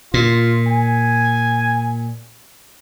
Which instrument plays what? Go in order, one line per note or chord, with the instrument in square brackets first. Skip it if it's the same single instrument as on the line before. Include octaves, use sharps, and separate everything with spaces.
[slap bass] A#2 [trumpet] F4
[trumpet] G#5